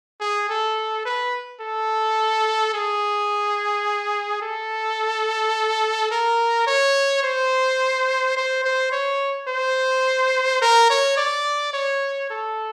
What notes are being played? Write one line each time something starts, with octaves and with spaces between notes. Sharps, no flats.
G#4
A4
B4
A4
G#4
A4
A#4
C#5
C5
C5
C5
C#5
C5
A#4
C#5
D5
C#5
A4